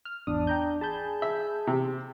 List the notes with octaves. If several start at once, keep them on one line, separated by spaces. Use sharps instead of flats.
F6
G#1 E2 D4 D#6
G5 A#5 G6
G#4 A5 B5 G6
E5
C3